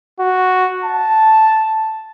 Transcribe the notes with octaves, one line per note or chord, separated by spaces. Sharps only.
F#4
A5